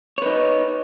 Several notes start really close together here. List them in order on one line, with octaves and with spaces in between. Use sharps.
C#5 B4 D#4